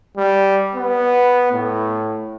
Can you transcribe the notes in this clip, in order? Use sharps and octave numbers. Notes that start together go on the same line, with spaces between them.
G3
B3
A2